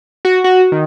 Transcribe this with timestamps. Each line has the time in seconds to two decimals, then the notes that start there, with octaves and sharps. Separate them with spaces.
0.25 F#4
0.44 F#4
0.72 D#3